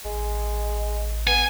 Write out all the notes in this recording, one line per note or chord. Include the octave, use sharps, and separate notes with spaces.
A1 G#3
B3 G#5